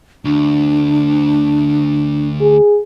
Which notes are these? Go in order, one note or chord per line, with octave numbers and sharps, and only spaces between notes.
D2 D4
G#4